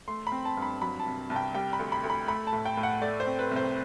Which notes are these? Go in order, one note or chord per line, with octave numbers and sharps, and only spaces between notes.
A3 C6
B5
C4
A5
G2
B5
F#3 B5
A5
C2
C2 A5
G5
G3 G5
B5
D2
B5
D2
B5
A3 B5
A5
A2
G5
A2
F#5
A3 D5
C5
C4
B4
C2
C5